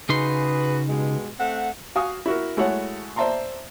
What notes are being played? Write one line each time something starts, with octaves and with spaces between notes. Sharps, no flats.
C#3 D#4 F#4 G#4 B4 C6
G2 B2 G#3
A3 C4 F#5
F#4 F5 G#5 D#6
E4 F#4 A#4
G#3 A3 E4 F#4 C#5 F#5
C5 D5 E5 A5 A#5 C6